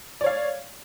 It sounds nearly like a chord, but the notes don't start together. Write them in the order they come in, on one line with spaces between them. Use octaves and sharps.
D5 C#5 F5